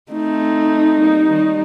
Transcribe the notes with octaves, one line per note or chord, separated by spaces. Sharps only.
A3 C4 D#4
G3 A#3
D#3 G3